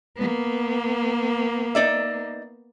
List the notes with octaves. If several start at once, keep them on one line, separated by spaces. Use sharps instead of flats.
A#3 B3
D#4 D5 E5